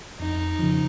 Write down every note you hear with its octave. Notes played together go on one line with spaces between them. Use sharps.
F2 D#4
C#3 F3